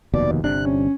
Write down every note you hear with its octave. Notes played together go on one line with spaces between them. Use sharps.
F1 D#2 B2 D5
D#3
G1 C3 D4 F#6
C#4